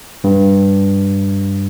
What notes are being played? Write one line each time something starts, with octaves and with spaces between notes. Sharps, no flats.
G2